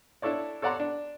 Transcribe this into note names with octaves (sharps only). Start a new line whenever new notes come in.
D4 E4 A4 C#5 D5
A4 C#5 D5 F#5 A#5 C6
D4